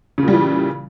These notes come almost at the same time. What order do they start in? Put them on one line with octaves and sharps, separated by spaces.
C#3 A#2 G3 E3